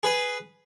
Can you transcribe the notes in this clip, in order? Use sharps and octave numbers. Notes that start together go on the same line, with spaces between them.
G#4 B4